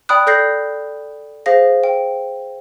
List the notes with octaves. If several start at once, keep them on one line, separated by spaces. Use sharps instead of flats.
D5 G5 B5 D#6 F#6
A4 D5 G6 A#6 C7
G#4 C5 F5 A#6
G5